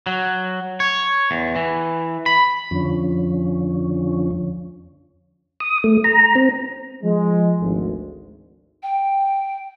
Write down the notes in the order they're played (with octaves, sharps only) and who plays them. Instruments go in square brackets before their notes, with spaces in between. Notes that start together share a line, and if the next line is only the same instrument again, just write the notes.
[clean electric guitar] F#3
C#5
E2
E3
B5
[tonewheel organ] F2 D3 F3 C#4
D#6
A3
A#5
C4
[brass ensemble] F3 G#3
G#1 D2
[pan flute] G5